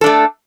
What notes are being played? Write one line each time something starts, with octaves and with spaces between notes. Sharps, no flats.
A3 D4 A4